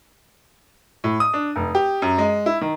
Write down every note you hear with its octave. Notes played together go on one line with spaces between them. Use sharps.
A2
D#6
D4
F1
G4
F#2
G#3
E4
D#3